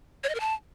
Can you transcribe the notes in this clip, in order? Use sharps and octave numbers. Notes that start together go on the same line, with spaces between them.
C#5
D#5
A#4
A5